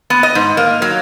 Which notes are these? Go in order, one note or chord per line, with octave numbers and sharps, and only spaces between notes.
B3
D#5
G#2
A#3
F#3